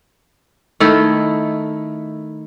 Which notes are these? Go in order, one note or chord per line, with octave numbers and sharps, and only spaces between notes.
D#3 A3 E4